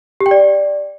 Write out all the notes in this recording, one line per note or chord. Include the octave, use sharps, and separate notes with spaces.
G4
G5
D5